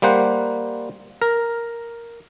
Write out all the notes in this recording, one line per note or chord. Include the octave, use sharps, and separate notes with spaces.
G3 A#3 C5 F#5
A#4